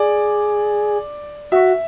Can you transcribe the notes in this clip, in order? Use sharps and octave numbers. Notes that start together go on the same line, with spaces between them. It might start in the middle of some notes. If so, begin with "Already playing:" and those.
Already playing: G#4 D5
F#4 E5